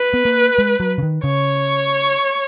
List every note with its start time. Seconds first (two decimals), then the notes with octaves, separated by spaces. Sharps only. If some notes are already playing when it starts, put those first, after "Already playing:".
Already playing: B4
0.14 B3
0.25 A#3
0.58 G#3
0.80 F#3
0.98 C#3
1.03 D#3
1.24 C#3 C#5